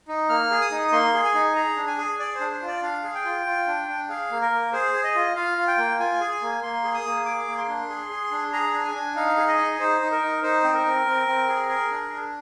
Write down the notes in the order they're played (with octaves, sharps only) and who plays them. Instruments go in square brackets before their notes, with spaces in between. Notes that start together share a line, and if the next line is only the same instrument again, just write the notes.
[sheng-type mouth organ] D#4
A#3 F6
G#4
D#6
D#4
A#3 C6
G#4
G#5
D#4
G#4 A#5
D4
G#5
G#4
G#4 D5
C5
D4
C5
F4
D5
D4 F5
G#4
G5
F4
F4
D4
D4
G#4 F5
A#3
A#4
A#3
G#4 C5
G#4
D#5
F4
F4 F5
F4
G5
A#3
F4 G#5
G#4
G#5
A#3
A#3 C6
G#4
D#6
A#3
G#4 D6
A#3
C6
D4
G#4
G#4
D4
G#4 A#5
D4
G#5
D4
D#4 F5
G#4
D#5
D#4
D#4 C5
D#4
A#4
D#4
D#4 C5
C4
A#4
C4
C4
C4
G#4
G#4
D4
D4